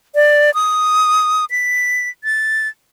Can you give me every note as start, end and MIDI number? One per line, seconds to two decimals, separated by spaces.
0.15 0.53 74
0.54 1.45 87
1.51 2.09 95
2.24 2.68 93